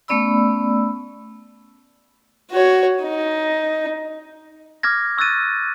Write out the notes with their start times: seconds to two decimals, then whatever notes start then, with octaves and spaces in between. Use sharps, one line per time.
0.08 A3 B3 C#4 D5 B5 E6
2.51 F#4 C#5
3.03 D#4
4.83 D6 F6 G#6 A#6
5.18 C#6 E6 F#6 A6 D#7